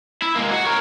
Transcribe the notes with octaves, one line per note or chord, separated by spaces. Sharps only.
E4
G#3 A#3
F#4
A#4 C#5